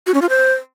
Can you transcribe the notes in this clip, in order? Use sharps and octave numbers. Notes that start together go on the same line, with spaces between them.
F#4
C#4
F4
C5